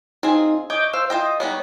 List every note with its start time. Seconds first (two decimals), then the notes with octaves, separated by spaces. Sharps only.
0.23 C4 D#4 F4 G#4
0.70 C#5 D#5 D6 G6
0.93 C5 F5 E6
1.10 F4 C5 D#5 G5
1.40 G3 B3 D#4 C#5